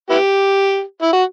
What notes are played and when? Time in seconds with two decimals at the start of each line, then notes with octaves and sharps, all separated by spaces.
0.10 B3 E4 G4
1.02 E4
1.13 F#4